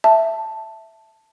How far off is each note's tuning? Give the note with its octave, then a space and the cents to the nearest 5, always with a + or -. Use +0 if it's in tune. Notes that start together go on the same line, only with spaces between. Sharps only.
E5 +0 A5 +0